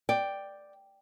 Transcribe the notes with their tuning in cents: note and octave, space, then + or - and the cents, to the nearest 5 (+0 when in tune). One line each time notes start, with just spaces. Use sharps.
D5 +5 G5 +0